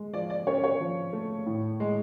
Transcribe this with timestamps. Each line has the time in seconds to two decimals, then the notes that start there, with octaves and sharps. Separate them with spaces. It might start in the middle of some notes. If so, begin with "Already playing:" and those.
Already playing: G#3
0.13 F3 D5
0.30 D5
0.47 C#4 C#5
0.64 C#5
0.80 F3
1.13 A3
1.46 A2
1.80 G#3